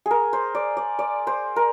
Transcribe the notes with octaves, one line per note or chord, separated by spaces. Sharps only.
G#4
A#4
C5
D5
D5
D5
C5
A#4